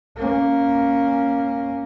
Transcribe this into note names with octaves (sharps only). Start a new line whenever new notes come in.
A#3 C#4